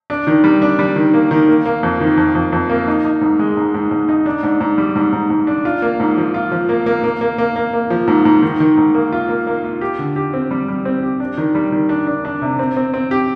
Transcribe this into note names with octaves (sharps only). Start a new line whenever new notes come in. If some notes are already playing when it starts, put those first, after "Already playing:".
D4
D#3
G3
D4
G3
D#3
A#3
D#3
A#3
A#3
F2
D#3
F2
F2
F2
A#3
D#4
D#4
G#2
G#3
G#2
G#2
G#2
D#4
D4
G#2
G#2
G3
G#2
G#2
G#2
D4
F4
A#3
G#2
F3
F4
F3
A#3
A#3
A#3
A#3
A#3
A#3
A#3
F3
G#2
G#2
D#3
D#3
G#2
A#3
F4
A#3
A#3
F4
G4
D3
G4
C4
G3
G3
C4
G4
D4
D#3
G3
D#3
D4
D4
D4
C3
C4
C4
C4
G4